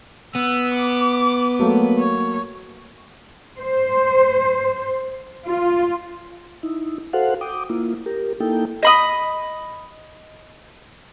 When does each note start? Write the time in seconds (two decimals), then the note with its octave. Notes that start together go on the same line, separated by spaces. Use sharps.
0.35 B3 E6
0.74 D6
1.59 F#3 A3 A#3
1.99 C#5
3.59 C5
5.47 F4
6.63 D#4 E4
7.13 F#4 A4 C5 F5 F#5
7.41 G5 D6 D#6
7.70 A#3 E4 F4
8.06 G4 A#4
8.40 A#3 D#4 E4 A4 G5
8.83 D#5 B5 D#6